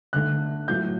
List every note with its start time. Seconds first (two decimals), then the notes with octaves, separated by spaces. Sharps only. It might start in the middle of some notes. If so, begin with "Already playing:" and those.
0.13 D2 D3 A3 F#6
0.68 A2 F#3 A3 G6